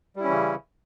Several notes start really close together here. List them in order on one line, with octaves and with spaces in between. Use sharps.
G3 E4 C#4 E3 C#3